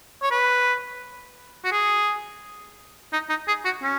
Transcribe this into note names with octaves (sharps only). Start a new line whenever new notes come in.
C#5
B4
F#4
G#4
D#4
D#4
G#4
F#4
C#4